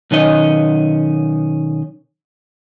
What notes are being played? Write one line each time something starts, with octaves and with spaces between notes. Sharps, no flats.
B1 D#3 C#4 D#5